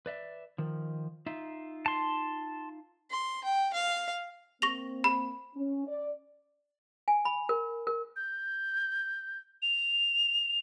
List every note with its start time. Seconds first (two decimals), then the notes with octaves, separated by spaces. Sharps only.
0.06 B4 D5 E5
0.58 D#3 F3
1.26 D#4 F4 E5
1.86 A5 C6
3.10 C6
3.44 G5
3.73 F5
4.62 A#3 C4 C#6 A#6 F7
5.04 B5
5.55 C#4
5.87 D5
7.08 G#5
7.25 B5
7.49 A#4
7.87 A#4
8.16 G6
9.62 F7